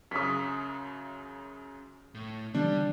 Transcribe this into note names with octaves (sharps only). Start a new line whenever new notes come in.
F#2 C#3 D#6 B6
A2
D3 E3 G3 B3 D4